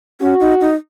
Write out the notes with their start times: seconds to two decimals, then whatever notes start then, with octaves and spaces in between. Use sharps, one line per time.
0.20 C#4 F#4
0.40 D#4
0.61 D#4